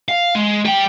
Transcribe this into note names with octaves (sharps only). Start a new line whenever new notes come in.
F5
G#3
G3 G5